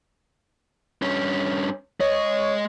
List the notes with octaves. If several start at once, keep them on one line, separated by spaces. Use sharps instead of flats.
G2 C#4
G#3 C#5 D#5